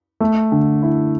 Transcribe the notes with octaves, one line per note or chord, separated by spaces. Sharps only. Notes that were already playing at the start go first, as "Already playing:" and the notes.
A3
D3
E4